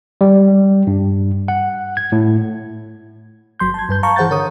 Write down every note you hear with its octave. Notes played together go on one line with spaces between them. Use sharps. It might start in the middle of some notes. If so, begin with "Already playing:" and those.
G3
G2
F#5
G#6
A2
G1 F#3 C6 G6
A5 G#6
G2 B4 G6
F5 A5 A#5 C#6
E3 G#4 C5 F#5 G6 A6
D3 A#4 C#5 C#6 D#6